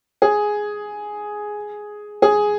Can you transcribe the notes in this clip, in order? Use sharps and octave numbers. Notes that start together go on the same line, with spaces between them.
G#4
G#4